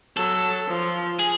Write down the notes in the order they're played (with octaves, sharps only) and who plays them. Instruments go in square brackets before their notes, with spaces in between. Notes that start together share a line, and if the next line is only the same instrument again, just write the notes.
[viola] F#3 [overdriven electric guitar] A4
[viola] F3
[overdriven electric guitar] G#4